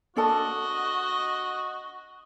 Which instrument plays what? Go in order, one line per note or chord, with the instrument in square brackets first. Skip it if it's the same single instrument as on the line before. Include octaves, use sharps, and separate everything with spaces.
[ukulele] D4 A4 A5 [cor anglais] F#4 [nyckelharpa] D#5